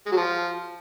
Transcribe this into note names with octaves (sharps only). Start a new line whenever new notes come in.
G#3
F#3
F3